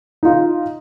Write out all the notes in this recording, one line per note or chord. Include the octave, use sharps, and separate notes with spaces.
D#4 F4